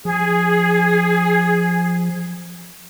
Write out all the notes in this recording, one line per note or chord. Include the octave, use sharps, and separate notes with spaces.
F3 G#4